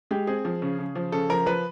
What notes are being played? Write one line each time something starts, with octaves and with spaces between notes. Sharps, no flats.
G#3 G4
C4 G#4
F3
C#3
C#3
F3
C#3 A4
F3 A#4
F3 B4